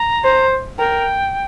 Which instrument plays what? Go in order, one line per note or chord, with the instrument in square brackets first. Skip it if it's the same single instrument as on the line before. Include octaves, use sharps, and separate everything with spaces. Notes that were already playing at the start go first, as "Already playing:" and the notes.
Already playing: [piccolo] A#5
[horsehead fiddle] C5
[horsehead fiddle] A#4 [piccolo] G5